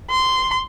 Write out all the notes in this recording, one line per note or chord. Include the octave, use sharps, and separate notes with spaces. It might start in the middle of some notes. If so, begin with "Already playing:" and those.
C6